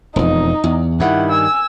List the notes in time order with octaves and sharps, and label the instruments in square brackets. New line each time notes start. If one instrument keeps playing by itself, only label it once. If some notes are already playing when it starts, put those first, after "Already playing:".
[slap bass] E1 F2 [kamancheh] D#4
[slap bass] E2
[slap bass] G2 D#3 [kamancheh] E4 F#5
[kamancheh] G#5 E6